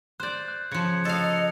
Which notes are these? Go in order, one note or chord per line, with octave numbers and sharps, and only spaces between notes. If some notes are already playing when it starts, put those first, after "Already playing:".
C5 D5 F#6 G6
F#6
C#3 F3 G#6 C#7
A4 D#5 F5
C#7